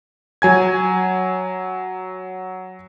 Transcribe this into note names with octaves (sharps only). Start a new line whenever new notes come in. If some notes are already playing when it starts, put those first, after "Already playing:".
F#3 G#5 G#6